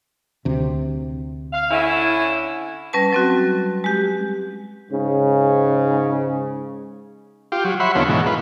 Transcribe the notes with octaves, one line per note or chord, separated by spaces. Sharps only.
D2 C3
F5
D3 C#4 E4
G3 C#4 B4 A5
F#3 C4 F#4
G#3 G4
G#2 C#3
F4 G4
F#3
C#5 E5 F#5 B5 C6
D#2 D3 B3 F4 C#5
G#2 B2 E3
F4 B4